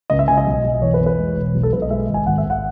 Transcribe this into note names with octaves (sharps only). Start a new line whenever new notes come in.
C#2 D#5
E5
C#2 G#5
D#5
B1
B1
E2 C#5
B4
E2
B4
G#3
E1
B1
A4
B1 B4
D#5
G#3 E5
G#1
G#5
G#1 F#5
E5
G#1
F#5